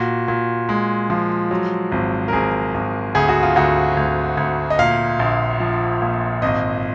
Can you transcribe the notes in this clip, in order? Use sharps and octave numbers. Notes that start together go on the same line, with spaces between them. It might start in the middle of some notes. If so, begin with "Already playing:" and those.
Already playing: A#2 F#4
A#2
G#3
F3
F#3
G#1
A#4
G#1 G#4
G#1
D2 G#4
F#4
F4
D2 F#4
D2
D2
D#5
A#2 F5
A#1
F3
A#2
G#1 D#5